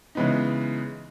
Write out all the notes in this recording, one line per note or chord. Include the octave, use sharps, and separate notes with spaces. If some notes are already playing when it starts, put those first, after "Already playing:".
C#3 E3 G#3 B3 D#4